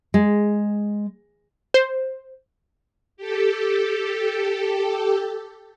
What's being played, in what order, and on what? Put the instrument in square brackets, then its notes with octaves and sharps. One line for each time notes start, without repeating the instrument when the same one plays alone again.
[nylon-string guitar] G#3
[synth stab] C5
[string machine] G4 A4